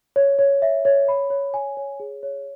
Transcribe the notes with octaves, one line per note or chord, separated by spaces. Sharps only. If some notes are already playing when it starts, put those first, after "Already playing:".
C#5
C#5
E5
C#5
B5
C#5
G#5
C#5
G#4
C#5